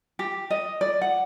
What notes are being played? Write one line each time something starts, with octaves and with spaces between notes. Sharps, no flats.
G4
D#5
D5
F#5